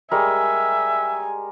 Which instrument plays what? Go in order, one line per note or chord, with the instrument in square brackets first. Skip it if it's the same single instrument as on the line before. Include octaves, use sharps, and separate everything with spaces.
[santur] G3 G#3 A#4 [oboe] E5 [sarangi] G#5